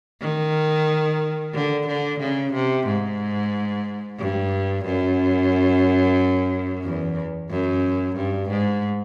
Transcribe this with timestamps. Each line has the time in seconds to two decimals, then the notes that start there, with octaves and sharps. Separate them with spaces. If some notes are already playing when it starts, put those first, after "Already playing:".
0.21 D#3
1.54 D3
1.87 D3
2.20 C#3
2.53 C3
2.87 G#2
4.19 G2
4.86 F#2
6.84 E2
7.51 F#2
8.17 G2
8.50 G#2